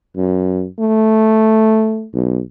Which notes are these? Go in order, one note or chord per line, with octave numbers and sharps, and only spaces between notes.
F#2
A3
B1